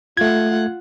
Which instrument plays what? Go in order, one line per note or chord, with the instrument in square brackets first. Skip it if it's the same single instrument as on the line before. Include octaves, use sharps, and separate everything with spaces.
[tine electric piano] A3 G#6 [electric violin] F4 F#5